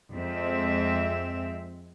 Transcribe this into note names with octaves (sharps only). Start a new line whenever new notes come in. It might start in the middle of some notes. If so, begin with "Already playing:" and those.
F2 G#3 C4 E5